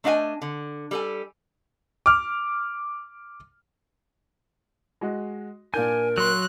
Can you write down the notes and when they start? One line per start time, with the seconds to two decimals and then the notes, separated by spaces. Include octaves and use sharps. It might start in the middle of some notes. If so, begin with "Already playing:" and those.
0.04 A3 D4 D#5 F5 G#5
0.42 D3
0.91 G3 A4 G#5
2.06 D6 F6
5.01 G#3 F#4 D#5
5.74 A#2 D4 A#4 G#5 G6
6.18 F#3 C6 F#6